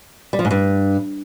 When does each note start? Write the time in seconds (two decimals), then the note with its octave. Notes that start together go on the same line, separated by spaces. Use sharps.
0.33 G3
0.39 F3
0.45 G#2
0.51 G2